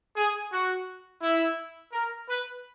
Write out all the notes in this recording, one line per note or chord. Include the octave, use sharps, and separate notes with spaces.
G#4
F#4
E4
A#4
B4